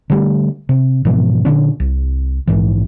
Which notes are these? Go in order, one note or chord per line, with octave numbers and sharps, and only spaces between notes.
D3 G3 A3
C3
G#2 B2 E3 F3
A#2 D3 C#4
C2
A#1 G#2 E3